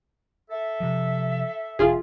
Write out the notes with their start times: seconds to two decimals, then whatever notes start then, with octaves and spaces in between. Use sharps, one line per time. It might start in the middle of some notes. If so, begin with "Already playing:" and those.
0.50 A4 E5
0.80 C3 F3
1.79 E1 F4 G#4